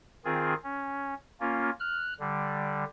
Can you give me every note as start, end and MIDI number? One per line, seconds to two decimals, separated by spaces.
0.25 0.54 51
0.25 0.54 60
0.25 0.54 65
0.25 0.54 68
0.63 1.14 61
1.40 1.70 58
1.40 1.70 61
1.40 1.70 65
1.80 2.14 89
1.80 2.14 90
2.20 2.84 50
2.20 2.84 55